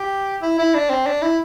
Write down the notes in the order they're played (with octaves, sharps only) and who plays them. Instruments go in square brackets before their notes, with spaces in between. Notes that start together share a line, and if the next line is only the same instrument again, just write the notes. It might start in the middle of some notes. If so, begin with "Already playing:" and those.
Already playing: [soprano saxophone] G4
E4
E4
D4
C4
D4
E4